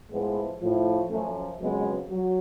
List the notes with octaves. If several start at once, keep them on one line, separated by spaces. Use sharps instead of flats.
A2 F3 G#3 B3
A2 F3
F#2 F3 A3 C#4
F2 C#3 F#3 G#3 B3
F#3